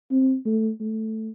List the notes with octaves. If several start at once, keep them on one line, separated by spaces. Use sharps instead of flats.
C4
A3
A3